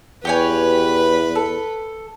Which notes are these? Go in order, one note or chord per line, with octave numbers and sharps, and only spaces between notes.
E2 G4 B4 C#5 G#5 B5
A4